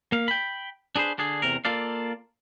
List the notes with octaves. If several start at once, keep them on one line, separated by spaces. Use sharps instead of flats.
A#3 F5
G5 B5
D4 G#4 B4 C5
D3 D4 G#4
E2 C3 A#4
A#3 F4 A4 D5 F5